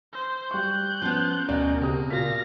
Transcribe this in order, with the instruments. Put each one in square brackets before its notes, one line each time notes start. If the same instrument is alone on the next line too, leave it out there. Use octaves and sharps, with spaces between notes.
[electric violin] C5
[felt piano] G3 C#6 [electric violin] F#6 G6
[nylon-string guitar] F3 B3 [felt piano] C#4
[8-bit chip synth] D2 C#4 [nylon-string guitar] B2 [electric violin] A#4 [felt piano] D5
[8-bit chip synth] C#3 [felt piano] C4 G4 D#6
[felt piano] A#2 B6 [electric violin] F5 A#6